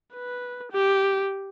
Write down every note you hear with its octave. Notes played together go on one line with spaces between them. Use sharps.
B4
G4